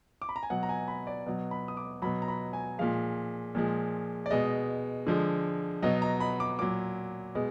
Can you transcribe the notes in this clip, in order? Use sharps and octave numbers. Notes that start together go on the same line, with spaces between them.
D6
B5
A#5
G#5
B2 F#3 F#5
A#5
G#5
B5
D5
B2 F#3
B5
D#6
D6
B2 F#3 B5
A#5
B5
G#5
A#2 F3 G#3 F5
A#2 F3 G#3
D5
B2 G#3 D#5
D3 F3 G#3
B2 F#3 D#5
A#5
B5
D6
A#2 F#3 D6
B2 G#3